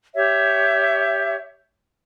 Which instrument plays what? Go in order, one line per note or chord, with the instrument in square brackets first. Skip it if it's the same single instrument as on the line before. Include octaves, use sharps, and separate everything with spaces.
[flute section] G4 C#5 E5